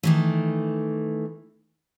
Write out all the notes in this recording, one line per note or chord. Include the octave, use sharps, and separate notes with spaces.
D#3 E3 A3